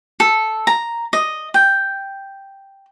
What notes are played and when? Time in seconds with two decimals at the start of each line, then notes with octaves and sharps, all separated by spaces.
0.20 A4
0.67 A#5
1.13 D#5
1.54 G5